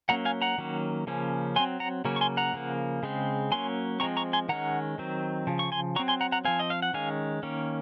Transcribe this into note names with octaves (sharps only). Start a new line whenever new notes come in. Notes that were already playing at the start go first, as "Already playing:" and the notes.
F#3 A#3 C#4 F#5 A#5
F5 G#5
F#5 A#5
D#3 F#3 A#3 C#4
C#3 F3 A#3 C#4
F#3 C4 G#5 C6
F#5 A#5
C#3 F#3 A#3 C#4
C#6
G#5 C6
F#5 A#5
C#3 F3 A#3
C#3 G#3 C4
F#3 A#3 C#4 G#5 C6
F3 G#3 C4 A#5 C#6
A#5 C#6
G#5 C6
D#3 G#3 C#4 F#5 A#5
D#3 F#3 C4
C#3 F3
C#6
G#5 C6
F#3 C4 A#5 C#6
G#5 C6
F#5 A#5
F#5 A#5
F3 C4 F5 G#5
D#5
F5
F#5
D#3 G#3 C#4 F5 G#5
D#3 A#3 C#4